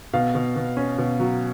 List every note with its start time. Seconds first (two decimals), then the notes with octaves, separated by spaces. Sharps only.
0.13 B2 F5
0.35 B2
0.56 B2
0.77 C#4
0.98 B2
1.20 F#3